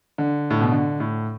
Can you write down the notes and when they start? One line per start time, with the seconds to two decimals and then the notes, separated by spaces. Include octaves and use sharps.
0.18 D3
0.50 A2
0.61 B2
0.72 D3
1.00 A2